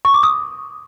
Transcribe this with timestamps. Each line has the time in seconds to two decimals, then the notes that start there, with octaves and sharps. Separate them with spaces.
0.05 C#6
0.14 D6
0.23 D#6